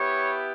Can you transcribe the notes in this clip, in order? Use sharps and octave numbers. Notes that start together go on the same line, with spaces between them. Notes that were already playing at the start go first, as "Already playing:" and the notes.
Already playing: B3 E4 G4 C#5